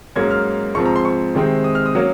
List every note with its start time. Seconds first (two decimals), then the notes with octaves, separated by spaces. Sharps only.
0.16 G#2 F#3 A#3 C#4 G#6
0.31 F6
0.75 G#2 F3 C4 C#6
0.86 A#5
0.96 C6
1.05 C#6
1.35 C3 D#3 G#3 C4
1.64 D#6
1.75 F6
1.86 D#6
1.95 F#3 A#3 C#4